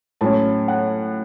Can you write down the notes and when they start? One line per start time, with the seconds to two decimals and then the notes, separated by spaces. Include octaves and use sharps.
0.21 A2 F#3 C#4 A5
0.68 F#5